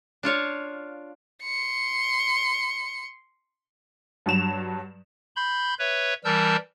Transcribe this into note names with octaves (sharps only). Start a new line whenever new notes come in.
D4 F4 C#5 F5
C6 C#7
G2 F#3 E7 F7
B5 C6 G6
B4 C#5 E5
E3 G3 A#4 A5 E6 G6